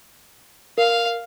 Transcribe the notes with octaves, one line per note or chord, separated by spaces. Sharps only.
A#4 F5